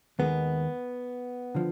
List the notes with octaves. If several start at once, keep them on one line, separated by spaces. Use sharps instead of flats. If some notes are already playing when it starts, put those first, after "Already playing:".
D#2 D#3 G#3 B3
D3 F3